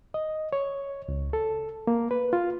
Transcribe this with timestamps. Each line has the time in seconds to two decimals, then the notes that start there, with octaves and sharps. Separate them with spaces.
0.14 D#5
0.53 C#5
1.08 C#2
1.33 A4
1.87 A#3
2.11 B4
2.33 F4